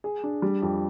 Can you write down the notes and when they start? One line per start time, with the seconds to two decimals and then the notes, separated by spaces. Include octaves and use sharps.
0.04 G#4
0.24 D4
0.42 G3
0.62 F2